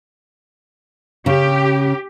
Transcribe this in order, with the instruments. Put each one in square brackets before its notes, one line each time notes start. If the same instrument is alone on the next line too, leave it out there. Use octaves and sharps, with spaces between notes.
[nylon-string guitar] C#3 [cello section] G4